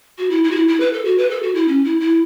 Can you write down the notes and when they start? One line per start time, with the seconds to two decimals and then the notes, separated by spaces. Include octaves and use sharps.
0.18 F#4
0.30 E4
0.44 E4
0.51 F#4
0.55 E4
0.68 E4
0.80 B4
0.93 A4
1.05 F#4
1.18 B4
1.30 A4
1.42 F#4
1.55 E4
1.68 C#4
1.84 E4
2.00 E4